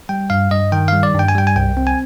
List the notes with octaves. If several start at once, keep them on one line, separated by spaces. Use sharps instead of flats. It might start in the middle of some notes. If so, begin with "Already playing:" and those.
G3 G5
G2 F5
G2 D#5
D#3 G5
G3 F5
D5
G2
G5
G#5
G3 G5
G#5
C2 G5
C4
G#5